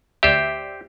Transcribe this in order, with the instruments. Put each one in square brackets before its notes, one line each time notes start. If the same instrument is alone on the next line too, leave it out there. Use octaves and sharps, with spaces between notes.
[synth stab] D2 D5 E5 [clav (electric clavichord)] G4 C5